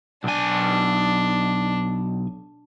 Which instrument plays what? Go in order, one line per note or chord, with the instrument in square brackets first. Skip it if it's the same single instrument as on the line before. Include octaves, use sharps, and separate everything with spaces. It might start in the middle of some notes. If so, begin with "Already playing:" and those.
[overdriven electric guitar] B1 G#5 [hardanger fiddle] D4